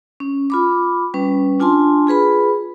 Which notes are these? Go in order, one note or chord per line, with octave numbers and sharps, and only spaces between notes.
C#4
F4 B5 D6
G3 C#4 B4
D4 F4 G#5 A5 C6
F4 G#4 B4 B5